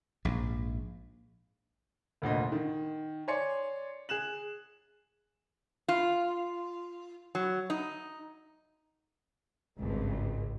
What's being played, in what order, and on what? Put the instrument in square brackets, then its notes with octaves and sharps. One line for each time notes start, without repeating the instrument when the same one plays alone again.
[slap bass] A#1 G#2
[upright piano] F1 D2 A#2 D#5
D#3
C#5 D5 G#5 C6 C#7
G#4 F#6 E7 F#7
[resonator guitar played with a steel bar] F4
F#3
D#4
[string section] G#1 C#2 G2